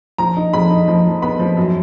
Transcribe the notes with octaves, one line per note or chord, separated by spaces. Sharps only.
F3 A#5
D#4
F2 B5
D#4
F3
F3
B3 B5
F3
F#2